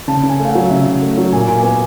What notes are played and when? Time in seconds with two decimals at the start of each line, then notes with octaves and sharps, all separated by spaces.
0.08 C#3 A5
0.23 C#3
0.29 G#5
0.40 A3
0.45 F5
0.49 F#5
0.55 F#3
0.70 C#3 E5
0.86 C#3
1.02 A3
1.18 F#3
1.32 A#2 G#5
1.47 A#2 G#5
1.63 B3 G#5